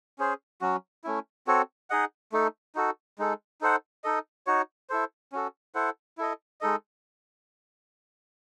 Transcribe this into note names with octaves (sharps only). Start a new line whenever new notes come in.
C#4 G#4 C5
F#3 C#4 F#4
A3 C#4 E4
C4 F#4 A4 C#5
D#4 G#4 D#5 F#5
A3 D#4 A4
D#4 F#4 A4
G#3 D#4 A4
D#4 A4 C5 F#5
D#4 A4 D#5
D#4 F#4 C#5
E4 A4 C5
C#4 F#4 A4
E4 A4 C5 F#5
E4 A4 D#5
G#3 D#4 A4 D#5